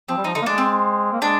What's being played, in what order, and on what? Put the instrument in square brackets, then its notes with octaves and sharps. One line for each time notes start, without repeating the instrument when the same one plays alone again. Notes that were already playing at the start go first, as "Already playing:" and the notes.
[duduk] F3 [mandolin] C4
[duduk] G3
[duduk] F3 [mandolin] D#4
[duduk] D3 [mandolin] D#4
[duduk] A#3
[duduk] G#3 [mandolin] D4
[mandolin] C4
[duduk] A#3
[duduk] G#3 [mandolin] D4